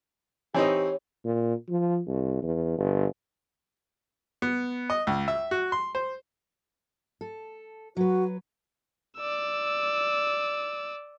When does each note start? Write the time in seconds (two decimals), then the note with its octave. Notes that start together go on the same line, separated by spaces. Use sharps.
0.54 E3 C4 D#4 G4 C#5
1.25 A#2
1.69 F3
2.07 C2
2.43 E2
2.78 G1
4.42 B3
4.90 D#5
5.07 C#2
5.28 E5
5.51 F#4
5.72 C6
5.95 C5
7.21 A4
7.97 F#3 F#4 B4
9.17 D5 E6